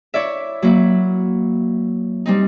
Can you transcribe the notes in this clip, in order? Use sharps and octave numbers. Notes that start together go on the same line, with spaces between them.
E4 C#5 D5 E5
F#3 A#3 E4
G3 C4 D#4